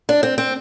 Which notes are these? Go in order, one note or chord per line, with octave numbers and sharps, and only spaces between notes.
D4
C4
C4